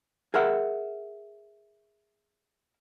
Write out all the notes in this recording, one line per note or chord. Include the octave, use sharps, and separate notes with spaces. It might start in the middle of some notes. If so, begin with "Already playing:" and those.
G#4 A#4 E5 F#5